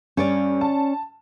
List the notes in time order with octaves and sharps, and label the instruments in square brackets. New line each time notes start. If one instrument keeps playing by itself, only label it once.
[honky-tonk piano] G2 [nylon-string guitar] C#4 C#5 D5
[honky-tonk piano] A5